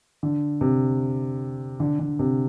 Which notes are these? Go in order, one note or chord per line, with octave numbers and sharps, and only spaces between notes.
D3
C3
D3
D3
C3